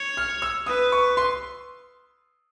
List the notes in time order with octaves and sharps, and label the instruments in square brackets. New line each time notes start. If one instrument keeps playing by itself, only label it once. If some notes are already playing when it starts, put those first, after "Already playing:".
Already playing: [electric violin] C#5
[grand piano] F6
E6
[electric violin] B4 [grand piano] D#6
[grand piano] C#6
C6